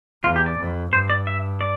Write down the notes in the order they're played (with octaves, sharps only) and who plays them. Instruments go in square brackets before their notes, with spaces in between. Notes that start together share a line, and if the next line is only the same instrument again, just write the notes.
[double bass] E2 [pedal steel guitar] F4
[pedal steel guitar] G4
D5
[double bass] F2
[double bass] G2 [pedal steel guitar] C5
[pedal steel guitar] D5
E5
D5